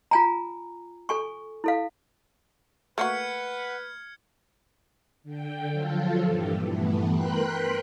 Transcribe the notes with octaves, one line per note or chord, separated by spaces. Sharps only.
F4 G#5 A#5
A4 G#5 C#6
E4 A4 F5
A3 A#3 F#4 B4 F#5 F6 G#6 C#7
D3 G5
F3 F#3 F4 A4
G2 A#2 E3 G4
G2 E3 A3 B3
A#4 B4 G5 B5 C6 F#6